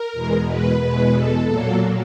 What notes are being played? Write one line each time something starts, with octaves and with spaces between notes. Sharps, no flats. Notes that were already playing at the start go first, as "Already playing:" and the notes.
Already playing: A#4
E2 B2 G#3
B4
E2 B2 G#3 B4
A4
A#2 F#3 A#3